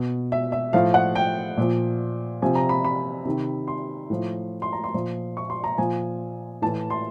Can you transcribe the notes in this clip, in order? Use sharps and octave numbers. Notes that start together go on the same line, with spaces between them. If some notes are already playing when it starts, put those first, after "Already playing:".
Already playing: B2
E5
E5
A2 F3 F5
F#5
G5
A#2 F3
C3 F3 G#5
A#5
B5
B5
C3 D#3
C6
A2 F3
C6
A#5
C6
A#2 F3
C#6
C6
A#5
A#2 F3 G#5
A2 E3 A5
C6